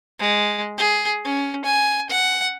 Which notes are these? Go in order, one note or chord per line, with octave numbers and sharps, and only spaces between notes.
G#3
G#4
C#4
G#5
F#5